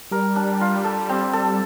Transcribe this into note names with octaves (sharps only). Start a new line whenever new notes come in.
G3 A#4
D4
F4
A4
C4
A4